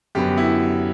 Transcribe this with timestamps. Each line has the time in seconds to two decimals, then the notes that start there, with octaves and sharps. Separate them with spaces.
0.15 F#2 D3 F#3 B3 G4
0.37 E4